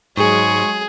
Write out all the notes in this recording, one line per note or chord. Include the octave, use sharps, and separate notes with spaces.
G#2 F#3 G#3 G#4 C#6